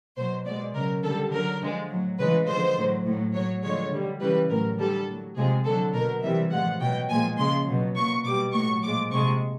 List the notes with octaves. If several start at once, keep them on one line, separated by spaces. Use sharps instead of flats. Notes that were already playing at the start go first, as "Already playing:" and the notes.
B2 F#3 C5
B2 G#3 D5
C#3 F#3 A#4
D3 G3 A4
D3 F#3 A#4
D3 F3 G#3
A2 F#3
C#3 E3 G#3 B4
D3 F3 G#3 C5
A2 F#3
A2 F#3
A2 F#3 C#5
D3 F3 G#3 C#5
D3 G3
C#3 E3 G3 B4
A2 F#3 A#4
D3 G3 A4
A2 F#3
C3 F3 G#3 G#4
D3 F#3 A4
B2 F#3 A#4
C3 E3 G3 E5
A2 F3 G#3 F#5
B2 F#3 G5
A#2 F3 G#3 G#5
C#3 F3 G#3 C6
B2 F#3
A#2 F#3 C#6
B2 G3 D6
A2 F#3 C#6
A#2 F3 G#3 D6
C3 F3 G#3 C#6